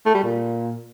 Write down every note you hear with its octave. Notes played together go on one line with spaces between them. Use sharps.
A3
G3
A#2